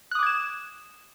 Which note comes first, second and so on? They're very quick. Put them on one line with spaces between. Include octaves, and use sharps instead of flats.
F#6 D#6 D6 G#6 E7